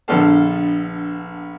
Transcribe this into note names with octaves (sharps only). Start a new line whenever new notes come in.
A#1 D3 B3 A4 F5 A5